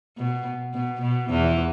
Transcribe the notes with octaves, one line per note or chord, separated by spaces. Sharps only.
B2
B2
B2
E2 E3